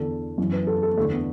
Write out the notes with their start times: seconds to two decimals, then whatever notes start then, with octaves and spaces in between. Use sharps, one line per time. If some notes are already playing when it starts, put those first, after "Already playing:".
Already playing: E2 D3 A4
0.38 F#2 E3
0.52 B4
0.67 A4
0.83 A4
0.97 E2 A3
1.00 D3
1.12 B3